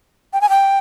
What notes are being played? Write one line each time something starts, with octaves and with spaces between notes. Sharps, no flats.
G5
G#5
G5